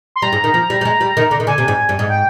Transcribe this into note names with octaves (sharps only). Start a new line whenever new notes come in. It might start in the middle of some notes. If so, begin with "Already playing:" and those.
C6
G3 A#5
G#2
D#3
F3
G3
G3
G#3
G3
D#3
D3
D#3
D3 G#5
C3
G#2
G2
G#2
G5